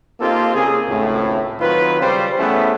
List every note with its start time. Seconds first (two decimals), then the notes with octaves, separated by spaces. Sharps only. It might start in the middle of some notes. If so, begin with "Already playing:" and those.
0.20 A#3 C4 D#4 F4 G4 A4
0.54 C#3 A#3 C4 G#4
0.88 G#1 C#2 A2
1.60 D#3 F#3 C4 F4 B4
2.01 C#3 G3 C5
2.38 E3 A3 B3 C#4 E4 G#4